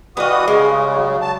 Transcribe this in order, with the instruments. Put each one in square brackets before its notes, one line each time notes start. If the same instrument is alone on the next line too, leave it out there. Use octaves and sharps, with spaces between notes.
[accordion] E3 F#4 D#6 [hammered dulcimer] G3 F5 [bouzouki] B4 D#5
[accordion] C#3 [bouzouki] G#3 [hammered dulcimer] F5 C#6
[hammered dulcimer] F#3
[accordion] A5